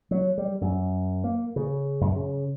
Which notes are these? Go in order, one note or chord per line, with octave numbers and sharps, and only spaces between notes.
F#3
G3
F#2
A#3
C#3
F#2
C#3